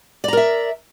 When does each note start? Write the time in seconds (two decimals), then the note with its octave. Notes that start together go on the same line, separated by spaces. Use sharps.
0.24 D5
0.28 A#5
0.33 A#4
0.37 E5